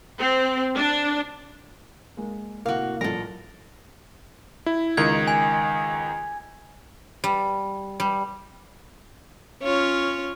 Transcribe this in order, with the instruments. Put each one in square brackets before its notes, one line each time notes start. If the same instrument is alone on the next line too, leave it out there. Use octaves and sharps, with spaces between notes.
[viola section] C4
D4
[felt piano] G#3 A#3
[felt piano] A2 C3 [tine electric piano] A#3 [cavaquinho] F#4 F5
[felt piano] A1 F#2 A#2 [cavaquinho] A4 A#4 [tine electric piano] A#6
[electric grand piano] E4
[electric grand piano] C#2 D#3 [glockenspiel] G#6
[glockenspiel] G#5
[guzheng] G3
G3
[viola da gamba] C#4 F4 C#5